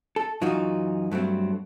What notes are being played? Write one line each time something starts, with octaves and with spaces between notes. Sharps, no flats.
A4
F#2 E3 D#4 F4 F#4
G2 F#3 A3 C4